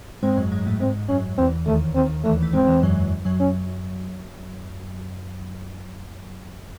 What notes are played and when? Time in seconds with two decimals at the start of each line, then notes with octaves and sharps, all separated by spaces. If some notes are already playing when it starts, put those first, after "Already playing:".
0.23 G#2 G#3 C4
0.37 F#2 F#3
0.51 G#2 G#3
0.66 A2 A3
0.80 G#2 G#3 C4
1.09 F#2 F#3 C#4
1.38 E2 E3 C4
1.67 D#2 D#3 A3
1.95 D#2 D#3 C4
2.24 E2 E3 A3
2.42 A3
2.53 G#2 G#3 C4
2.67 E2 E3
2.83 F#2 F#3
3.25 F#2 F#3
3.40 C#4